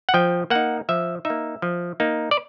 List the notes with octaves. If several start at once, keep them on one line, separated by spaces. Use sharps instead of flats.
F#5
F3 G5
A#3 D#4 F#5
F3 E5
D#4 E5
A#3
F3
A#3 D#4
D5